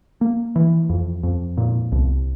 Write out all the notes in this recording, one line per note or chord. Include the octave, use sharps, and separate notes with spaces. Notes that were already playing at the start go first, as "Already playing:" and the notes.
A#3
E3
F2
F2
A#2
C2